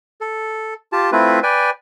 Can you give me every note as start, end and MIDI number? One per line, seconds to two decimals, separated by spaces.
0.21 0.74 69
0.93 1.10 65
0.93 1.10 67
0.93 1.10 81
1.12 1.40 57
1.12 1.40 60
1.12 1.40 64
1.12 1.40 65
1.12 1.40 71
1.43 1.70 71
1.43 1.70 74
1.43 1.70 79
1.43 1.70 80